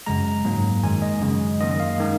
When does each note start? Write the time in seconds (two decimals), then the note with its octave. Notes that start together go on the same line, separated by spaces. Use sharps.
0.06 F#2 C#3 G#3 A#5
0.45 G#2 F#3 A#3
0.83 F#2 D#3 G#3 G#5
1.02 D#5
1.21 F#2 C#3 G#3
1.61 F#2 D#3 A#3 D#5
1.71 D#5
1.80 F5
1.98 D#3 G#3